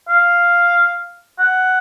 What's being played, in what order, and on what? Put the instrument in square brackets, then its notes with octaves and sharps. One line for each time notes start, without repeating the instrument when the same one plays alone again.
[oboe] F5
F#5